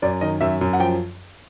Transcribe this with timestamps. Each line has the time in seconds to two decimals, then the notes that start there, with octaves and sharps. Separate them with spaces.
0.02 F#2 D5
0.21 D#3 D#5
0.41 F#2 E5
0.61 F#2
0.73 F#5
0.79 F3 G5